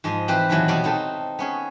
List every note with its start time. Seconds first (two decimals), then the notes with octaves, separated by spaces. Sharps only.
0.04 G#2 F3 D#5
0.28 E3 C4 G4 B4
0.49 F2 A#2 D#3 E3 F#3
0.68 B2 G3 D5 F5 B5
0.84 C4 D#4 A4
1.39 B3 C#4 G#4